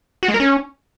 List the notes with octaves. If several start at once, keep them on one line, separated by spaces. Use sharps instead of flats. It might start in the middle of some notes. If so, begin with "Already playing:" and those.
F#4
G#3
A#4
C#4